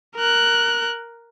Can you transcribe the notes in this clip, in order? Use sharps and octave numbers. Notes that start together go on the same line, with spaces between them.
A#4 F#6